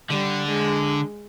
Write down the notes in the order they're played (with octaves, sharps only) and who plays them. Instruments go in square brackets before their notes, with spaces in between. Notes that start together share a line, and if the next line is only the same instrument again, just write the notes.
[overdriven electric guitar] D3 [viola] G3
[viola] G#3